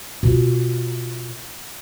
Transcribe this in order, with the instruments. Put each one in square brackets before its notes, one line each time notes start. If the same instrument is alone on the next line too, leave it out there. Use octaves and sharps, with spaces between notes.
[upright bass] B2 F4